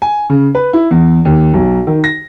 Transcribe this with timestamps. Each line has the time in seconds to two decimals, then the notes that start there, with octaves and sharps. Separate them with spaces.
0.02 G#5
0.30 C#3
0.55 B4
0.73 E4
0.91 E2
1.25 D#2
1.53 B1
1.87 D#3
2.04 A#6